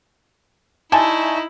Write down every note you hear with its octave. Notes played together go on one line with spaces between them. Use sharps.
D3 A3 D#4 E4 G#5 A5